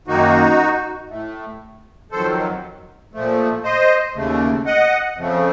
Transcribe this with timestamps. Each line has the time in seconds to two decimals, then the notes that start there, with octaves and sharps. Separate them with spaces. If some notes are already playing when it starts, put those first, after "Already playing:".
0.07 F#2 D#3 A#3 D#4 F#4
1.10 A2 A3
2.11 F2 D#3 F#3 A4 C5
3.14 A#2 F3 A3
3.64 C5 D#5
4.15 D#2 C#3 A3
4.66 D#5 F#5
5.17 F2 C#3 F3 A3